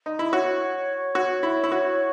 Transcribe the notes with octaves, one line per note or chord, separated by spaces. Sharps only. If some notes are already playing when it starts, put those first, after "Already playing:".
D#4
E4
F#4 C#5
F#4
E4
E4
F#4